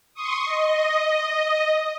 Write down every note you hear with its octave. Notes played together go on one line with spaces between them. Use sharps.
C6 C#6 D#6
D#5